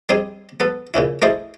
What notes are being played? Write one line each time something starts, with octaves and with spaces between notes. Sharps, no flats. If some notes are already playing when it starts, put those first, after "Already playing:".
G3 C4 D#4 G#4 G#5
B3 A4 B4
A#2 C#3 C#4 E4
A3 D#4 E4 G#4 A4 C5